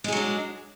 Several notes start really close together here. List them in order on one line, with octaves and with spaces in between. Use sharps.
G#3 G#4 F#3 D4